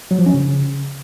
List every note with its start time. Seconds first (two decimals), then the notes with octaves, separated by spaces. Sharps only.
0.11 F#3
0.19 F3
0.26 C#4
0.34 C#3